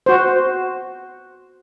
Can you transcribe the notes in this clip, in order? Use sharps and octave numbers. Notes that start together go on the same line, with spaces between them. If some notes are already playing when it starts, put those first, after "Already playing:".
F#4 C5